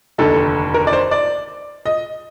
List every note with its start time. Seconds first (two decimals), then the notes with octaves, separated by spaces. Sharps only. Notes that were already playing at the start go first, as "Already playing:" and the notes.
0.18 F1 D#2 D3 A4
0.74 A#4
0.87 D5
0.93 C5
1.11 D5
1.86 D#5